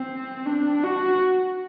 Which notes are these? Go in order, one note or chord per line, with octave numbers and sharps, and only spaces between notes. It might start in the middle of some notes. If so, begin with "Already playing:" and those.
Already playing: C4
D4
F#4